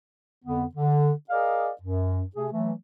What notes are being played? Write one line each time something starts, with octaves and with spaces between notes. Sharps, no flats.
F2 D3 B3
D3
G#4 A#4 D5 D#5 F5
F#2
C3 A3 G#4
E3 F#3 A3